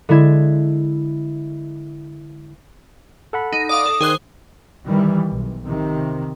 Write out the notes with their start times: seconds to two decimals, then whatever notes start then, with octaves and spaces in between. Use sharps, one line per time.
0.09 D3 G#3 E4 G#6
3.33 A4 F#5 B5
3.52 D#4
3.69 D5 F5 D6 D#6
3.86 A4
4.01 D#3 G#4 C5 F#6
4.87 D#3 E3 G3
5.32 B1
5.68 C3 D#3